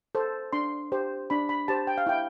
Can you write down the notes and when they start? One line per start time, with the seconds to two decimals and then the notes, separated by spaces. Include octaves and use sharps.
0.15 A4 C5
0.53 D4 C6
0.92 G4 C5
1.30 D4 B5
1.49 B5
1.68 G4 C5 A5
1.87 G5
1.98 F5
2.07 E4 G5